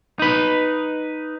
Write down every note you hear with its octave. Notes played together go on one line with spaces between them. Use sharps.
D#4 B4